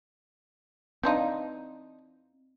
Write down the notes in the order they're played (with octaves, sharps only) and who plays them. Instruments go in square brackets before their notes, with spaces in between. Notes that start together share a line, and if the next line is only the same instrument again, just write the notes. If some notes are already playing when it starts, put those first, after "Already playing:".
[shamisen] E3 D4 D#4 [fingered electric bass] C4 [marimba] F5 C6 G6